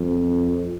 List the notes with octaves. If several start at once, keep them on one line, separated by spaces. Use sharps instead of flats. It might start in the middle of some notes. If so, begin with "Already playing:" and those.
Already playing: F2